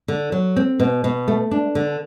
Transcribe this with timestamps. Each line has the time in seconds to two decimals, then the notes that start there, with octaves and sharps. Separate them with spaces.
0.08 D3
0.32 F#3
0.56 C4
0.80 B2
1.04 B2
1.28 A3
1.51 D4
1.75 D3